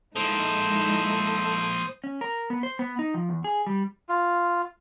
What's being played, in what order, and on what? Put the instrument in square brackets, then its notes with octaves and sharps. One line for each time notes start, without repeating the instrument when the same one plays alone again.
[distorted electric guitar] F3 A#3 [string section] G#3 D#4 E4 [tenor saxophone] A4 [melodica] C5 D#6
[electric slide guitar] C#4
A#4
B3
C5
B3
D#4
F3
E2
G#4
G3
[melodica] F4